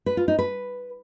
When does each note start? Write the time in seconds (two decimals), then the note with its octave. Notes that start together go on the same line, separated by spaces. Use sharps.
0.06 B4
0.17 F4
0.28 D#4
0.39 B4